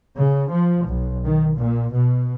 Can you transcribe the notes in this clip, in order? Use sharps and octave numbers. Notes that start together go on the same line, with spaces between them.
C#3
F3
B1
D#3
A#2
B2